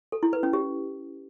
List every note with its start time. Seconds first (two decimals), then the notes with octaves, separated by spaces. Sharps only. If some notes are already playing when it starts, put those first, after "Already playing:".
0.12 A4
0.23 E4
0.33 B4
0.43 C#4
0.53 G4